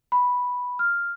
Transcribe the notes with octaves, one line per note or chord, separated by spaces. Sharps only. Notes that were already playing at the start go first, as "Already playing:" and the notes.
B5
F6